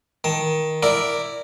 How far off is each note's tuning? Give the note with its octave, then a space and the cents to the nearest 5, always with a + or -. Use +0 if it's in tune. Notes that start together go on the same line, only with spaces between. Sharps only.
D#3 +15 A5 +15
E4 -5 A#4 -5 D5 +0